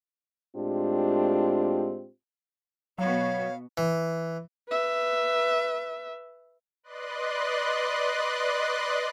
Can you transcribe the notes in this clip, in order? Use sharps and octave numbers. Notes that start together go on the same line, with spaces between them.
A2 G#3 C4 D4 F4 G4
B2 F#3 B3 F#4 C#5 F5
E3
B4 E5
B4 D5 D#5 C6 F#6